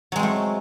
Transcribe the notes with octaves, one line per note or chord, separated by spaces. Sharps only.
F#3 G#3 A3 C4